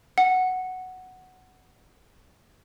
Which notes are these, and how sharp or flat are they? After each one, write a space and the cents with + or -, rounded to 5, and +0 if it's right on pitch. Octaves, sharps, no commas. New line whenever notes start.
F#5 +0